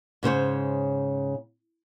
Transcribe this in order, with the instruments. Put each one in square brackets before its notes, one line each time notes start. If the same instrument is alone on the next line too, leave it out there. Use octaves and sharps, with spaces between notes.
[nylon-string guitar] G#2 C#3 C5 C#5